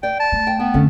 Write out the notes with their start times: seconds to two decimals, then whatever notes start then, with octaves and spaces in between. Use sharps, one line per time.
0.03 D5 G5
0.20 A5
0.32 A3
0.47 G5
0.60 B3 G5
0.74 F2 D3 A3 C#4 A4